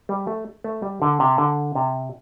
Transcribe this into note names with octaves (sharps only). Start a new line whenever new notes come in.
G3
A3
A3
G3
D3
C3
D3
C3